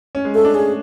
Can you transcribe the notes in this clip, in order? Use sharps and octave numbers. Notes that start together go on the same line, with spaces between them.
C#4
G#3
A3 A4
D4
C#4 G#4